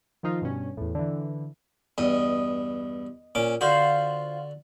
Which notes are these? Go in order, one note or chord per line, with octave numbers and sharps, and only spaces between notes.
D#3 F3 D#4 F4
G2 B2 C#4
E2 A2
D3 E3
E2 G2 D#5
A#2 C#4 D6
D3 F4 F#4 C5